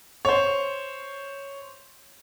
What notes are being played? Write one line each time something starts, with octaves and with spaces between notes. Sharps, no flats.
C5 C#5